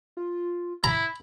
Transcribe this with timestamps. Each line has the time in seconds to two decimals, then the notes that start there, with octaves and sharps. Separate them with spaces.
0.17 F4
0.84 E4 A#5 B5